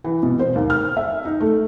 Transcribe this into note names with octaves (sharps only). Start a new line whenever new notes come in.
E3
B2
C5
D#2
F6
E5
D#4
A3